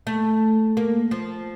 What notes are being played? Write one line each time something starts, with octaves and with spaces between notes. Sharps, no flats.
A3
A#3
F3